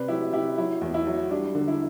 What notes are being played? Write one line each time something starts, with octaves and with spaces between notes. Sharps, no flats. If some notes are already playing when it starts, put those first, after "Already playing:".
Already playing: C3 B4 D5
F#3 E4 G4
C3 E4 G4
F#3 E4
E2
E4
F#3
G3 D4
D3
E4